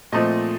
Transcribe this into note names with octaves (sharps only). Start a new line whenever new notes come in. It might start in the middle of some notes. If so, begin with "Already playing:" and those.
A#2 F3 A3 C4 D#5